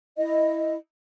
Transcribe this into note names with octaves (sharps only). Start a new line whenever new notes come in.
E4 D#5